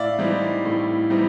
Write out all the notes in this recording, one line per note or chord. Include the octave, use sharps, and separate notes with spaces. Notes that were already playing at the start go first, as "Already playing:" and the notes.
Already playing: A2 D5 E5 F5
E3 G3 C4 D#4
A2
E3 G3 C4 D#4